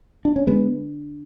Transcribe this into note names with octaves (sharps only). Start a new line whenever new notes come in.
D4
C#4
D3 G#3 B3